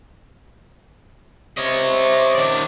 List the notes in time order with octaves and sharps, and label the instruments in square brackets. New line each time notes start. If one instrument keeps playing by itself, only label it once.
[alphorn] C3 [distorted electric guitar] C#5 D#5
[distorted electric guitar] D#3 D5